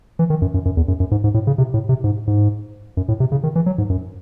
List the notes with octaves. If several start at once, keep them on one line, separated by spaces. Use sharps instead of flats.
E3
D#3
F#2
F#2
F#2
E2
F#2
F#2
G#2
G#2
A2
C#3
C3
A2
C3
G#2
G#2
F#2
A2
C3
C#3
D#3
E3
F#3
G#2
F#2